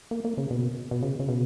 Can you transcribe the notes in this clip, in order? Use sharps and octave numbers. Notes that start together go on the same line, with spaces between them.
A#3
A#3
C#3
B2
B2
C#3
C#3
B2